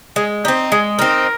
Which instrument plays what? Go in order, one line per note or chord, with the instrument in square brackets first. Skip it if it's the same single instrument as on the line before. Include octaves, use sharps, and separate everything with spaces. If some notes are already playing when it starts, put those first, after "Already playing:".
[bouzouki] G#3 [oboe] G#4
[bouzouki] C4 D#4 [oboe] G4
[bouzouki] G#3 [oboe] G#4
[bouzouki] C4 D#4 [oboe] A#4